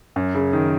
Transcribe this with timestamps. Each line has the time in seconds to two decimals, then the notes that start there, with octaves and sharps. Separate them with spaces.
0.16 F#2
0.35 C#3
0.53 D#3